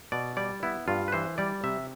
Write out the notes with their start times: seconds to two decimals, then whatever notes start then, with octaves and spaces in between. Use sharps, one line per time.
0.12 B2 D5
0.37 G3 D5
0.63 B3 E4
0.88 G2 F4
1.08 B4
1.12 E3 C5
1.38 G3 D5
1.64 C3 E5